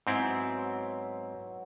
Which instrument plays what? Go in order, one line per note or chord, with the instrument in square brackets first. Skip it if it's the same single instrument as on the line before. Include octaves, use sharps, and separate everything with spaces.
[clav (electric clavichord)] G#2 C4 E4 [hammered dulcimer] F#3 B3